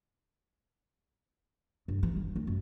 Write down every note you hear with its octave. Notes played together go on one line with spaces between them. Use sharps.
G2
E3
F#3
D2
F#2